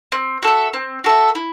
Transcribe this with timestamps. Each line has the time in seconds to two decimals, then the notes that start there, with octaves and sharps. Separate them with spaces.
0.12 C4
0.43 F#4 A4 E5
0.73 C4
1.04 F#4 A4 E5
1.35 E4